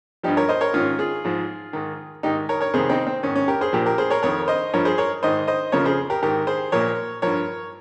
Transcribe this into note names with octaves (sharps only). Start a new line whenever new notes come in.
G2 F3 D#4 G4
A#4 C#5
C5 D#5
A#4 C#5
G#2 D#3 C#4 F4
F4 G#4
G#2 F3
G#2 D#3
G#2 D#3 D#4 G4
A#4 C#5
A#4 C#5
F2 C3 D#3 G#4 C5
C4 D#4
C4
G#2 D#3 C#4
C#4
G4 A#4
G#4 C5
A#2 F3 G4 A#4
G4 A#4
G#4 C5
A#4 C#5
F2 D#3 A#4 C#5
C5 D#5
G2 F3 A#4 C#5
G#4 C5
A#4 C#5
G#2 D#3 C5 D#5
C5 D#5
F2 C#3 F3 A#4 C#5
G#4 C5
G4 A#4
G#2 D#3 G4 A#4
G#4 C5
A#2 F3 A#4 C#5
G2 F3 A#4 C#5